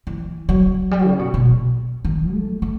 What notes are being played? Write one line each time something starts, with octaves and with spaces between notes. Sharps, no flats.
E3
F#3
G3
C#3
B2
B2
D#3
A3
A3